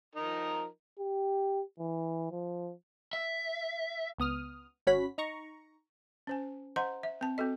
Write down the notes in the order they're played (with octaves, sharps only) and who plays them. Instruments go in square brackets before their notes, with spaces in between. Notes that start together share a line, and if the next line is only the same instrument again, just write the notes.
[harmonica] F3 D#4 A#4
[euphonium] G4
E3
F3
[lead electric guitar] E5
[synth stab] C#2 B3 D#6 F6
G#1 C#4 F#4 C#5 B5 B6
D#4 A#5 C#6
[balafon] C#4 C5 G#5
C5 D#5 F#5 A#5 C6
E5
C4 A5
C4 F#4 A4 D#5